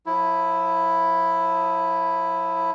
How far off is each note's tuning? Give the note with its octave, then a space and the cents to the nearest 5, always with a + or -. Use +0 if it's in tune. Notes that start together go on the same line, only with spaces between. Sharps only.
F3 +40 E4 +0